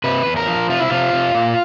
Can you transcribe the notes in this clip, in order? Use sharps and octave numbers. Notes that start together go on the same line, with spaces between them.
C3 B4
E2
A#4
F3
C3 F4
E4
C3 F4
C3
A#2